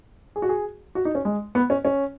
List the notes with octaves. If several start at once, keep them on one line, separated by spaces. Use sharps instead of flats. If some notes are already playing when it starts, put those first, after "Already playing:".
G#4
F#4
G#4
F#4
D#4
C#4
G#3
B3
C#4
C#4